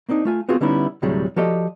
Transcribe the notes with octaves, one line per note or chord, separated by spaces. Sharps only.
A#3 C4 D4 D#4
A3 F4 G#5
B3 C4 F4 F#4 G#4
D3 G3 B3 C#4 D#4 E4
D2 A2 C3 F#3 G3 G#4
F3 F#4 G4 A4 D5 D#5